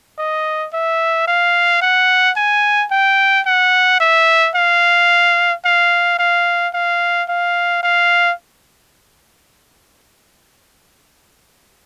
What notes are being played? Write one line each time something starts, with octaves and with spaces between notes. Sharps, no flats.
D#5
E5
F5
F#5
G#5
G5
F#5
E5
F5
F5
F5
F5
F5
F5